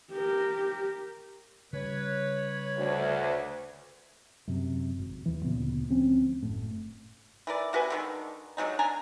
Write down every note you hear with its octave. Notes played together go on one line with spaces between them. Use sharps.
G4 A#4
C#3 G3 B4 C#5
D2
F#2 C3
G#1
D#2 E3
D2 A#2 C#3 B3
D2 F3 C4 C#4
F#1 A2
E3 A#4 D5
C3 F#4 B4 G#5
D3 D#3 G#3
D3 F#3 G#3 D#4
D3 D4 G#5 A#5